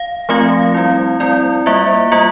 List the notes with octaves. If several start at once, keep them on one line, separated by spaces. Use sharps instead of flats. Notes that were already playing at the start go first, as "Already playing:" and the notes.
Already playing: F5
F3 A3 C4 F4 F5
G3 C4 E4
G3 C4 E4 D5
G3 A#3 F4 E5
G3 A#3 F4